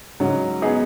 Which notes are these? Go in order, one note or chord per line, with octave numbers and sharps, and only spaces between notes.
G#2 C#3 F#3
B3 D#4 G#4